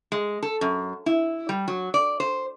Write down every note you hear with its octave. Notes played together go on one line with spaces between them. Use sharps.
G#3
A4
F#2
E4
G3
F#3
D5
C5